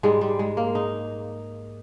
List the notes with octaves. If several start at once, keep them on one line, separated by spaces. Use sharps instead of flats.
G#2 G3 G#3
G3
G#3
A#3
D#4